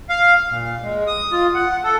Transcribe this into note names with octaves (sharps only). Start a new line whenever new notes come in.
F5
A#2
G#3
D#6
F4
F#5
A4